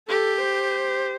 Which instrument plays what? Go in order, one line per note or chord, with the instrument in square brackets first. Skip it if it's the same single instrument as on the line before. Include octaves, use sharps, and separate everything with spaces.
[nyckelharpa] G4 [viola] A4
[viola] C5